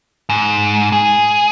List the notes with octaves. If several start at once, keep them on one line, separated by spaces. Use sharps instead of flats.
G#2
G#4